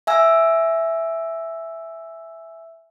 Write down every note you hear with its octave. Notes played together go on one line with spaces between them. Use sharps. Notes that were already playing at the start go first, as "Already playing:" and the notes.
E5 G#5 E6